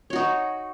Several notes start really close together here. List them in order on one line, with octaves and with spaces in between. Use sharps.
C#5 F#4 D#4